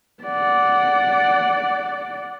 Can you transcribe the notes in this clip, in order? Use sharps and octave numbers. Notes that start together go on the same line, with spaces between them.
D5 F#5